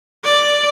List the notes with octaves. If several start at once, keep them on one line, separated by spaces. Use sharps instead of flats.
D5